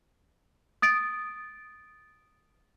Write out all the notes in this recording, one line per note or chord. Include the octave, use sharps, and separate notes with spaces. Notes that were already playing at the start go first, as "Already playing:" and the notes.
D#6 A6 D7